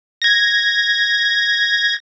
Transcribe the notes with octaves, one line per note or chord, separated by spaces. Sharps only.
G#6 A#6